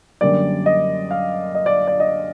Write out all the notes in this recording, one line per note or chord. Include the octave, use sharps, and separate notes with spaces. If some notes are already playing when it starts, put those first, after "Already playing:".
F#2 D3 G3 A#3 D5
D#5
F5
D#5
D5
D5
D#5